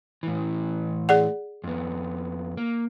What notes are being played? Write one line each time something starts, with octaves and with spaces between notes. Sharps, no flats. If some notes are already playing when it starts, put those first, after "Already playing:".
A2 E3
G#4 D5 F#5
F2 B3
A#3